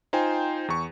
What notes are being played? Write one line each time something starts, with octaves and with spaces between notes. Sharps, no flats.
D#4 F4 C5 G5 G#5
E2 C#6